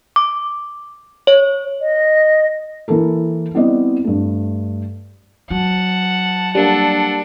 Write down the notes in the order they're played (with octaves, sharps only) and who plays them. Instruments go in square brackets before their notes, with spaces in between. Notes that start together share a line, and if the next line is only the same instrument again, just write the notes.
[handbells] D6
C#5
[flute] D#5
[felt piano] E3 A#3 A4 A#4
G3 B3 C4 E4 D5 D#5
G2 A3
[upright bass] F#3 [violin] F#5 A5
[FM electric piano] G3 A#3 [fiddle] D4 [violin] A4 F#5